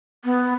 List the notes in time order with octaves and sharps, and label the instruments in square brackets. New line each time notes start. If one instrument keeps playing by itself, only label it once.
[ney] B3